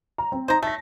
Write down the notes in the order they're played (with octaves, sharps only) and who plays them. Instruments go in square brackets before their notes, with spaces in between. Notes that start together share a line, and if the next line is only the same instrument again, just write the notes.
[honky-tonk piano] A#5
C4
[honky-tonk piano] D#4 [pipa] C5 A#5
[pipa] A3 [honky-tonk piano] A5 A#6